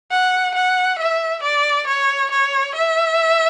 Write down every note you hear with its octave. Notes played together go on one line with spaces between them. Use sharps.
F#5
F#5
E5
D5
C#5
C#5
E5